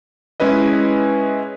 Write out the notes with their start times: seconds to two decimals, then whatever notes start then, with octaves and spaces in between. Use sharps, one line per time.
0.40 G#3 C#4 E4 B4 D#5